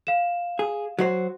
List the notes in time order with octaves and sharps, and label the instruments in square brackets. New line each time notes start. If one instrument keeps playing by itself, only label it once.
[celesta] F5 E7
[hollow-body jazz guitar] G#4
F#3 F#4 C5